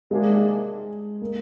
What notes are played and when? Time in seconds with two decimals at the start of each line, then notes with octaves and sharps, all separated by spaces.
0.11 C3 D#3 G#3 A#3 D4 G#4
1.22 A#3